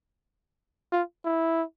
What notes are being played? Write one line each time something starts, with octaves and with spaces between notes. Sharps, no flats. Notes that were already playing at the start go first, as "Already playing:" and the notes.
F4
E4